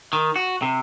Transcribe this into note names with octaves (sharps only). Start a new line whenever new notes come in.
D#3
F#4
C3